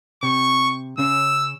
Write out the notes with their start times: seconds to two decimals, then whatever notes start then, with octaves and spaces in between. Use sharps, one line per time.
0.23 C3 C#6
0.98 C#3 C#4 E6